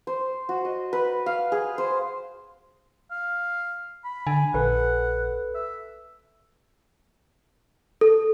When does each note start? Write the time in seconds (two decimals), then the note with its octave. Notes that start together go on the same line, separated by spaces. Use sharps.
0.07 C5
0.49 F#4
0.65 D#5
0.93 B4
1.26 F5
1.52 G#4
1.78 C5
3.11 F5
4.04 B5
4.27 D3 G#5
4.54 A#1 A4 B4 F#5
5.55 E5
8.01 A4